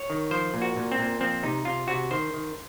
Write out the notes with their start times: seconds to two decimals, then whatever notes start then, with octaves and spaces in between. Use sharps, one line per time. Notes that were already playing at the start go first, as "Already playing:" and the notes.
Already playing: C#5
0.10 D#3
0.31 F3 C5
0.54 A#2
0.62 F#4
0.76 A#2
0.92 C4
0.99 A#2
1.20 F3 C4
1.43 C3 D#4
1.65 C3 F4
1.88 C3 F#4
2.11 D#3 C5
2.34 D#3